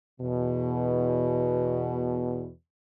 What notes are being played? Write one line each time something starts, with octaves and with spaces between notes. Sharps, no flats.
E2 B2